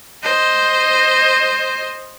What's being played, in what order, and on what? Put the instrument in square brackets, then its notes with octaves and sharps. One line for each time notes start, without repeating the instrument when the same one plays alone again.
[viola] C5 D#5